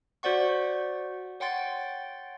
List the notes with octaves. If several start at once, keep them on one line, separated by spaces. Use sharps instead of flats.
F#4 C5 D5 F#5 C#6
C#5 F#5 G5 C6 A6